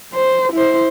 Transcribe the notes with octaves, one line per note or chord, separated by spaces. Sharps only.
C5
E4 C5